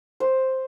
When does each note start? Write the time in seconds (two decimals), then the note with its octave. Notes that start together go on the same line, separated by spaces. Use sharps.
0.20 C5